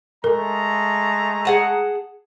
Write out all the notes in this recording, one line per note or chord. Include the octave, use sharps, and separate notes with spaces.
G#3 A3 A4 A#4 A#5
G#4 F#5 A5